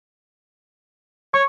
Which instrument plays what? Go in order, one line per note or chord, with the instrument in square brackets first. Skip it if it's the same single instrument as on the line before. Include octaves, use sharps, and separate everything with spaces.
[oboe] C#5 [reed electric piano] C#6